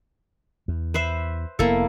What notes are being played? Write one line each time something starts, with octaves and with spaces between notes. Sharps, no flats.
E2
B4 C5 E5
F1 A#3 B3 E4 A4